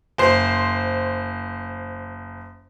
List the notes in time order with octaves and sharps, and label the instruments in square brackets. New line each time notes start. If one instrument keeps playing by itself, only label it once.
[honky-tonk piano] F#1 C5 C7